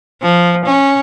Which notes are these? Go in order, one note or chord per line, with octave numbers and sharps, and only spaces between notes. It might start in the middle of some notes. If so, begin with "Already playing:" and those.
F3
C#4